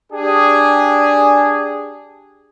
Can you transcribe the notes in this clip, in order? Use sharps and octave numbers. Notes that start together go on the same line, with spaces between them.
D4 G4 G#4